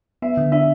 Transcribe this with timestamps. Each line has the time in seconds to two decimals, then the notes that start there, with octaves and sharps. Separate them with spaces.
0.22 B3 E5
0.37 D3
0.52 D4 E5